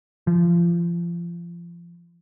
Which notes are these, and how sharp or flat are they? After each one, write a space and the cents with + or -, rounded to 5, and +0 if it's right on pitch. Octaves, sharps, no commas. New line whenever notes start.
F3 -30